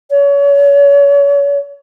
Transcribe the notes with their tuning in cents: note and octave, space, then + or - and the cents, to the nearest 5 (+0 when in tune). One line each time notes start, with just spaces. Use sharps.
C#5 +35